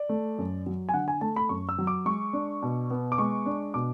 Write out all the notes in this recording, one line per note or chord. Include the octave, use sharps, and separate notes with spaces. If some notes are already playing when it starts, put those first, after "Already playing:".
Already playing: D5
A3
F#2
F#3
G#5
D3 F#5
G#5
A3 A5
B5
F#2 C#6
E6
F#3
D6
G#3 C#6
D4
B2
B3
D6
G#3 C#6
D4
B2 D6